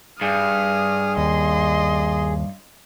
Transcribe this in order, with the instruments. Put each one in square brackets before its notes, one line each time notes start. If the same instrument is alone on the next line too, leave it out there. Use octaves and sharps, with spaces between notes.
[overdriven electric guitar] G2 [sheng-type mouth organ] G#4 [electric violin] D#6 F6
[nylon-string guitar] D#2 [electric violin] D#5 C6